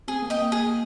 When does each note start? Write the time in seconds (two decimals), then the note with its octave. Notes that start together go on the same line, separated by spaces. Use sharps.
0.08 C4 G#4
0.22 A#3
0.30 D#5 G5
0.37 A#3
0.52 G#4